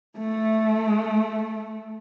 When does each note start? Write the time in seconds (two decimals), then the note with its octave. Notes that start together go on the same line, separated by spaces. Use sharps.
0.18 A3